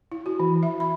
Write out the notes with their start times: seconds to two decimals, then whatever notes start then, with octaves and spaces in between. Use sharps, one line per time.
0.12 E4
0.26 F#4
0.40 E3
0.63 E5
0.80 B5